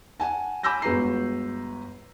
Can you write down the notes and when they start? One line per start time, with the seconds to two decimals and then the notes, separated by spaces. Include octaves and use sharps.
0.20 F#5 G#5 A5
0.63 G#5 B5 D6 E6 G6 A#6
0.82 G1 G#3 F#4 B4 A#5 C7